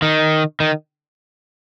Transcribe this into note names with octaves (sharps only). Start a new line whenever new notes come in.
D#3
D#3